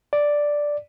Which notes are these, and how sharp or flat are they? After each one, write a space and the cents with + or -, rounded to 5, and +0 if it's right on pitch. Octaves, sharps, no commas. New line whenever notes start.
D5 +0